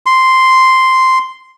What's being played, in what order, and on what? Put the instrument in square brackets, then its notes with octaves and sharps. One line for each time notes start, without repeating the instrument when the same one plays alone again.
[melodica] C6